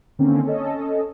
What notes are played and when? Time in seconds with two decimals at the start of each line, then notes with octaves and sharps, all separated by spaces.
0.19 D3 D#3 A#3 C4 C#4
0.45 C#4 A4 D#5